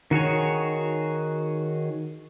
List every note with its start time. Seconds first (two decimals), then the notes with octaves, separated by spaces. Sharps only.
0.11 D#3 F#4 G#4 C#5